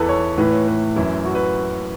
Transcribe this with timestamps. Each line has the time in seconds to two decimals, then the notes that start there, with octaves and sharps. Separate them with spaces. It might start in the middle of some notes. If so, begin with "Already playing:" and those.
Already playing: E2 E3 A4 B4
0.09 C#5
0.38 A2 E3 B4
0.52 C#5
0.68 B4
0.96 F#2 E3 E4
1.25 F#4
1.35 B4